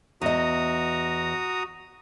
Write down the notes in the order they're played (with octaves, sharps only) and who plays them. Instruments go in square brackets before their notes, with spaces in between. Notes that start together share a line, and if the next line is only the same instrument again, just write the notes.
[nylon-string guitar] E2 D#5 [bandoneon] F#4 A#5 D#6